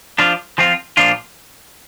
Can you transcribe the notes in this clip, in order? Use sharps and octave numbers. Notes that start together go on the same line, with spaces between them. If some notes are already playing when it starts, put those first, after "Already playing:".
F3 D4 F4
F3 C4 F4
A#2 F3 D4 F4